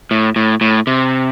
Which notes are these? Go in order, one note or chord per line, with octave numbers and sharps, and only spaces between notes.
A2
A2
A2
C3